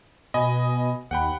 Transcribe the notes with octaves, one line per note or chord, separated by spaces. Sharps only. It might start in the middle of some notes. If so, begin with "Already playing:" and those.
B2 D#5 G#5 B5
D#2 F#5 G5 B5